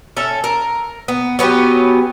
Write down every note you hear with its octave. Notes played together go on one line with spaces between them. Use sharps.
C#4 A4 E5
A#4
B3
F#3 B3 C#4 G4